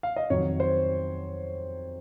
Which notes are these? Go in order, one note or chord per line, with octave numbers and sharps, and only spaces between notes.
F5
D#5
F2 D#3 F#3 C#5
C5